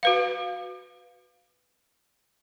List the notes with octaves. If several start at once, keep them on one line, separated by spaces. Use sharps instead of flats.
F#4 B4 F5